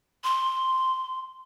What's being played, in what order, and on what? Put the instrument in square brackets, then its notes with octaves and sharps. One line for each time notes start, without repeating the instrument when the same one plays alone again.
[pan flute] C6